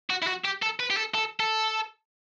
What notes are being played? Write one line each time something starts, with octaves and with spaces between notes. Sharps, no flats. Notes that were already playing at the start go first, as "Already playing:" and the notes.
F#4
E4
F#4
G4
A4
B4
G4
A4
A4
A4